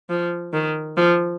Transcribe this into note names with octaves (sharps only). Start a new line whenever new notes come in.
F3
D#3
F3